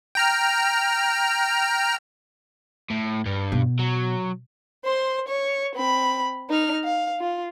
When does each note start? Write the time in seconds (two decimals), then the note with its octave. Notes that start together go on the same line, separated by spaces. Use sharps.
0.15 G5 A#5 F6
2.90 A2
3.26 G2
3.52 B2
3.79 F#3
4.85 C5 C6
5.28 C#5 C#6
5.75 C4 B5
6.50 D#4 F6
6.84 F5
7.19 F4